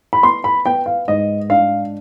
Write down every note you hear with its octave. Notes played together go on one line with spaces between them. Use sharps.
B5
B3 C6
B5
B3 G5
F5
G#2 D#5
D4 F5